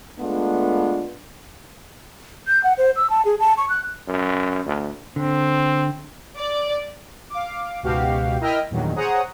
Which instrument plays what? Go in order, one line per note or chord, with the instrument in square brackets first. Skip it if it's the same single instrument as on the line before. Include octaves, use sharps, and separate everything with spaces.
[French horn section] G#3 A3 B3 D4 F4
[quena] G6
F#5
C5
E6
A5
G#4
A5
C#6
F#6
[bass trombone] F#2
D2
[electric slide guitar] D3 [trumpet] C4
[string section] D5
[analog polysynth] F5 D6
C#2 G#2 B2 F#4 G4 F5
E4 A#4 D#5 E5 G5 F6
E2 G2 A#2 D#3 F#3
G#4 C5 C#5 F#5 A#5 D#6